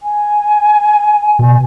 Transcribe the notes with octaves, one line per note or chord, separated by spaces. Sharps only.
G#5
B2